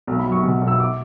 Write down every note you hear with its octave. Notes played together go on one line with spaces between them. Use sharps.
B1
B5
F#3
C#6
B2
B1
E6
D6